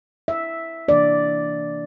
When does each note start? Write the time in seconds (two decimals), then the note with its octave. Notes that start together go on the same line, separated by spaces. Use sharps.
0.28 E5
0.88 C3 E3 A#3 D4 D5